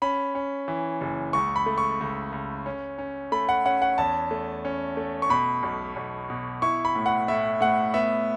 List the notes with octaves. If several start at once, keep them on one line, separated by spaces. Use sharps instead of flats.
C#4 B5
C#4
E3
F#1
C#2 C#6
B5
A3
C#6
C#2
C#2
C#4
C#4
A3 B5
F#5
C#4 F#5
F#5
E2 A5
A3
C#4
A3
C#6
B2 B5
B1
B1
B2
E4 C#6
B5
A2
F#5
A2 E5
A2 F#5
B3 E5